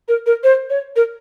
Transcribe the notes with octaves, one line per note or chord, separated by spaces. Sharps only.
A#4
A#4
C5
C#5
A#4